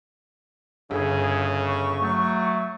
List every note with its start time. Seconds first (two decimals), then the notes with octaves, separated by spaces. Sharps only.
0.91 G1 C#3 G#4
1.67 C#6
2.02 F#3 A3